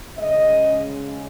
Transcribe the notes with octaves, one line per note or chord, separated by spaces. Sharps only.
C#3 G#3 C#4 D#5